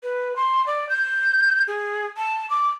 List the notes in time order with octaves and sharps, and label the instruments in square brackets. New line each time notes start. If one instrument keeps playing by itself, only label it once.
[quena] B4
C6
D5
G6
G#4
A5
D6